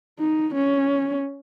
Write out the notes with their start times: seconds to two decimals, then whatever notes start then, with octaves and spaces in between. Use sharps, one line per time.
0.19 D#4
0.54 C#4